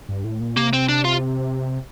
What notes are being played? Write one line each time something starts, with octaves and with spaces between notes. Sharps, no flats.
G2
A2
A#2
C3 A#3
C4
D4
F4